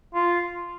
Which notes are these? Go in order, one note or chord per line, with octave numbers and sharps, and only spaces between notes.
F4